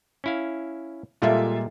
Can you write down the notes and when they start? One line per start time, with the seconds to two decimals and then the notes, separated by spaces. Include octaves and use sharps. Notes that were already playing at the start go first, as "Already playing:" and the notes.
0.24 C#4 E4 F5
1.22 A#2 G3 G#3 F4 A4 E5